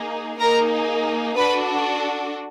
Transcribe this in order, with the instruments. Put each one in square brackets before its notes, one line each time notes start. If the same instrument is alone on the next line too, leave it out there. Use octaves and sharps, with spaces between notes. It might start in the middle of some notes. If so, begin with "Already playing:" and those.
Already playing: [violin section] A#3 D#4 G#4
A#3 D#4 G#4 A#4 A#5
D4 F#4 A4 B4 B5